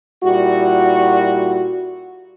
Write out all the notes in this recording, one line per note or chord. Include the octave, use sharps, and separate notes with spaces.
A#2 G3 E4 F#4